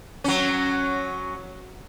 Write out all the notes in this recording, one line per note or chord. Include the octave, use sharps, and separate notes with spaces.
F#3 C#4